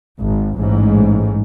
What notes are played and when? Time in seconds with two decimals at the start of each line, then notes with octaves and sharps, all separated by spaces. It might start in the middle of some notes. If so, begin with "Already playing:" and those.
0.19 G#1
0.58 A1 G#2